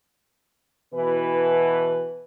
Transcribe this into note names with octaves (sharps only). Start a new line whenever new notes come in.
B2 E3 B4